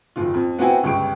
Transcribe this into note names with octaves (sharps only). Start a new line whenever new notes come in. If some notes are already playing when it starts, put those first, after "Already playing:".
F#1 D#3 F4
F2
B3 C4 E4 F#4 G5 G#5
G1 C#2 G4 C#6 D7